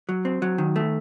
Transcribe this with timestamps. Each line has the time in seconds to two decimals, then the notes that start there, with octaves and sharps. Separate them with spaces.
0.09 F#3
0.25 C4
0.42 F#3
0.58 D#3
0.76 A3